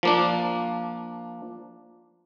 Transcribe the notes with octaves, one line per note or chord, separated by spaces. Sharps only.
F3 A#3 D4